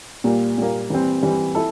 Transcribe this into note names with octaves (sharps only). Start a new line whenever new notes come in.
A#2 G3 A#3
A#2 G3 A#3
E3 G3 C4
E3 G3 C4
E4 A4